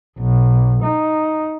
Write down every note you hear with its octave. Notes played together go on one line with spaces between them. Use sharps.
B1
D#4